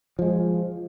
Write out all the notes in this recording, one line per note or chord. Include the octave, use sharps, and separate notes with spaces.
F3 G#3